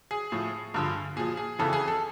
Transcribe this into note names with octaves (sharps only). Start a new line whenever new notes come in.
G#4
A2 F3
G2 D3 F3
A#2 F3 G#4
G#4
F2 C#3 E3 A4
G#4
A4